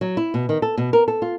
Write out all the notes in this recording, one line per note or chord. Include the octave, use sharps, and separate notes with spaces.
F#3
E4
B2
D#3
A4
B2
A#4
A4
F4